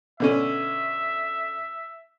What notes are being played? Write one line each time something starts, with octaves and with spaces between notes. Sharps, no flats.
B2 D3 C#4 E5